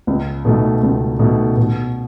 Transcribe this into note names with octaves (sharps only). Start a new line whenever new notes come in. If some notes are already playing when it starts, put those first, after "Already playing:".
C#2
B2 A3 D#4
C#2
B2 A3 D#4
B2